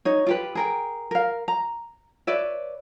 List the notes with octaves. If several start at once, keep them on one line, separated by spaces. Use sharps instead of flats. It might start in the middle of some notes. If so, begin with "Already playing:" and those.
D#4 C#5
F4 G4 B4
G#4 A#4 G5
A#4 F5
A#5
B4 C#5 D5 E5